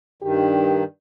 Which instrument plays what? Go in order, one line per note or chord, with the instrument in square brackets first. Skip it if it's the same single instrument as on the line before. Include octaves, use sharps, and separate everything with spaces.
[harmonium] G2 D#3 [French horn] G4